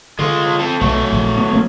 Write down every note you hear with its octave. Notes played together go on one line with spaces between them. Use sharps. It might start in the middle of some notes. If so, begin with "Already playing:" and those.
D3 G#3 F4
C4 A4
B1 F#3 A3
A#1
B3
A#3 C#4